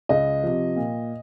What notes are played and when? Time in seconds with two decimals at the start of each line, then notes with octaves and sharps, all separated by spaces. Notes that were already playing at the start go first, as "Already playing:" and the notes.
0.09 C#2 D#5
0.44 C3 F3
0.76 A#2